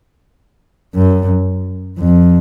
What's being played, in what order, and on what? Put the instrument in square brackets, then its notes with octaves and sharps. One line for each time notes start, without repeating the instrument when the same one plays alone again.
[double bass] F#2
F2